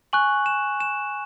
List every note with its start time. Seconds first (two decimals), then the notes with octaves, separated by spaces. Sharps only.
0.13 G#5 C#6 F#6 F#7
0.46 E7
0.80 E7